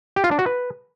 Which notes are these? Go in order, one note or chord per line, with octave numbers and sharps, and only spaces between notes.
G4
F4
D4
F#4
B4